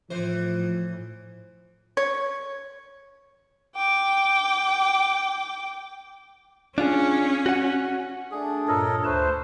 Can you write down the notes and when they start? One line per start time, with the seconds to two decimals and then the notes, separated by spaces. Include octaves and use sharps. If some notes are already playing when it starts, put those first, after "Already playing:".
0.10 A2 E3 F3 C5
1.97 C#5
3.76 G5 D6
6.78 C#4 D4 F4 G#4
7.46 F#4 F#5
8.31 A3 D4 G#4
8.68 G2 A#2 A4 A#4 C#5 D#5
9.04 D2 A3 B4 C5 A5